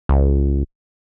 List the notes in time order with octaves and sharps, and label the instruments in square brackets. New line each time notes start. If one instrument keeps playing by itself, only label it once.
[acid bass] C#2